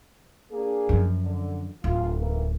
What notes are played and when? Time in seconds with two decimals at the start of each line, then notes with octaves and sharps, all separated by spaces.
0.52 A#3 D4 G#4
0.89 F#2 F3
1.23 D3
1.84 D1 F4
2.17 D#2 E3 A#3